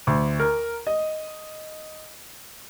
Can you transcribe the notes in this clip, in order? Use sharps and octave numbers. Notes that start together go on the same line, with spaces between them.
D2
A#4
D#5